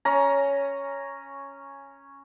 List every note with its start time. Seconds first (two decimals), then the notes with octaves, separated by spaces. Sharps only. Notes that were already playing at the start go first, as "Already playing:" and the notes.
0.05 C#4 A#5